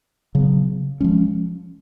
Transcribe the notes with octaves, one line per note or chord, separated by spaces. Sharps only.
C#3 F#3 B3
F3 G#3 C#4